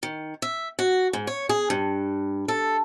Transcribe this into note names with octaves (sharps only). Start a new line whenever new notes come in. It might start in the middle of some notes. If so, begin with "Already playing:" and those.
D#3
E5
F#4
G#2
C#5
G#4
G2
A4